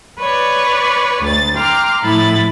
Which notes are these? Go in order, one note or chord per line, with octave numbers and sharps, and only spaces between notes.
B4 C#5 D5 C#6
D2 A6
G5 A#5 C6 D6 F6
A2 F3 E4 B5 A6